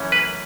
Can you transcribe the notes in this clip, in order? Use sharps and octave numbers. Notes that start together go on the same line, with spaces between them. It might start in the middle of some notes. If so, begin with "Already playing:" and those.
Already playing: F#2 E3 A3 C#4
B4